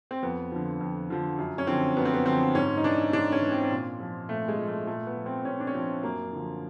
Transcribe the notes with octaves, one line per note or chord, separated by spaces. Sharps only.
C4
F2 B3
D3 F3
F2
D3 F3
F#2
C#4
D3 F3 C4
F#2 B3
C4
B3
D3 F3 C4
G#2 C#4
D#4
E3 D4
G#2 D4
C#4
E3
C4
A#2
F3
A#2 A3
G#3
F3
A3
A#2 A3
B3
F3
C4
A#2 C#4
D4
C#4
F3 C4
F#2 A#3
D3 F3